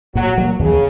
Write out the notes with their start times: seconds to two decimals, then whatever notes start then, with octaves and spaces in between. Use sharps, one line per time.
0.15 A#2 F#3
0.38 F#3 A#3
0.59 D#2 C#3